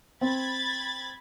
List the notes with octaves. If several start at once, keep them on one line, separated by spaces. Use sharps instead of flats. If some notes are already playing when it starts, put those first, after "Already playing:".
C4 B5 G#6 A6